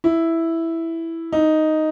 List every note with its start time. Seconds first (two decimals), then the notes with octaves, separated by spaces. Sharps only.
0.04 E4
1.33 D#4